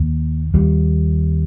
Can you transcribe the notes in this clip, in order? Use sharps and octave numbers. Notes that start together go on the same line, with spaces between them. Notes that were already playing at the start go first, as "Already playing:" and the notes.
Already playing: D#2 A#3
D#2 G3